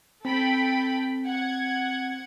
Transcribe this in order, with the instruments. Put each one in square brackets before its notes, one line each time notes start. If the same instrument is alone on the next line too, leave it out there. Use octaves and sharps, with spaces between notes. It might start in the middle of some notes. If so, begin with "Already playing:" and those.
[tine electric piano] C4 [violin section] A4 G5 B5
[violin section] F#5 G#6